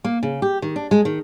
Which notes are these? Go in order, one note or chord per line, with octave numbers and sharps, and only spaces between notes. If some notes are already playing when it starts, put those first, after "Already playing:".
A#3
C#3
G4
D#3
D4
G#3
D#3